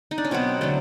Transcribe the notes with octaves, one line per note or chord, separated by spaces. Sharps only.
D#4
D4
C#4
B2 F#3 B3 C4
D3 F#3 A3